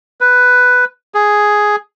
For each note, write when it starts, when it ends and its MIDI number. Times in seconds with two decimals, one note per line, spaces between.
0.21 0.85 71
1.14 1.76 68